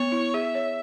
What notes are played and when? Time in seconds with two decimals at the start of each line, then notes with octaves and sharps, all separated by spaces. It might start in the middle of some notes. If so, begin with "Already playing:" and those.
Already playing: B3 C#5
0.12 E4
0.34 G#4 E5
0.55 C#5